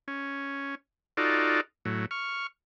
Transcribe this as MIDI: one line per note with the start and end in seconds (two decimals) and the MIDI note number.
0.08 0.75 61
1.17 1.61 63
1.17 1.61 65
1.17 1.61 66
1.17 1.61 69
1.17 1.61 74
1.85 2.06 45
1.85 2.06 54
2.11 2.47 85
2.11 2.47 89